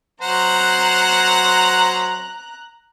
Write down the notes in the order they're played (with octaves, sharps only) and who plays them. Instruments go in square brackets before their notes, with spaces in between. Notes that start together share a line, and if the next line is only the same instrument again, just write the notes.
[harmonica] F#3 C5 F#5 [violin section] A#5 F#6